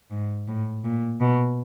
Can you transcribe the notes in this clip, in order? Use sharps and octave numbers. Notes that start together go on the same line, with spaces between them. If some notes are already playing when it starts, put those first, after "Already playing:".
G#2
A2
A#2
B2